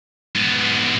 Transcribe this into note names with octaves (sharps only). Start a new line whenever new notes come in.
G#2 B3